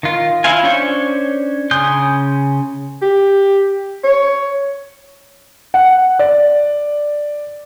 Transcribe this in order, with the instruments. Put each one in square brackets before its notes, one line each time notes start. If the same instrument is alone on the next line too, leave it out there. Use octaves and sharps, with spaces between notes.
[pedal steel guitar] D#3 F4
E4 F4 C5 F5 G#5
C#4 D4 C5 C#5 C#6
C#3 G#5 C6 D#6 G6
[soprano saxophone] G4
C#5
[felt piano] F#5
D5